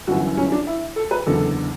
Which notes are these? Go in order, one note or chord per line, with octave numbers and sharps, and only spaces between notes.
G1 F#2 E3 F#4
C#4
D4
E4
A4
B4
F#1 E2 D3 A4